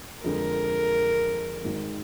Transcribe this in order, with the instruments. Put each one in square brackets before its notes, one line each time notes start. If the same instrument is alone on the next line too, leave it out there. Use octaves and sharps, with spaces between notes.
[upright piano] F2 D3 G#3 [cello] A#4
[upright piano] G#1 G#2 D#3 G#3